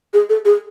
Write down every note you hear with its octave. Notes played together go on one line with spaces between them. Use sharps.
G#4
A4
G#4